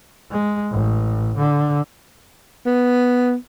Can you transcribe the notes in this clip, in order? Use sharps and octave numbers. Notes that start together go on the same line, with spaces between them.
G#3
A1
D3
B3